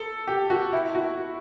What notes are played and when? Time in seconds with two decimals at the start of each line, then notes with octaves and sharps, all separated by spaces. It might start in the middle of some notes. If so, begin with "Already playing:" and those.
Already playing: A4
0.27 G4
0.50 F#4
0.73 E4
0.95 F#4